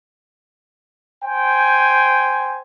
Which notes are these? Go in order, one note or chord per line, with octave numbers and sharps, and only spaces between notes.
C5 G5 G#5